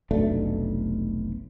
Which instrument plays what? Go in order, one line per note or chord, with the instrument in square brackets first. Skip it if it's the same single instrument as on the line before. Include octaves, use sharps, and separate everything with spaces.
[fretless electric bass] F1 B1 A3 D4